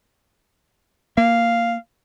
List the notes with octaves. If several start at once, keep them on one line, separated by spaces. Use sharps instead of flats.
A#3 F5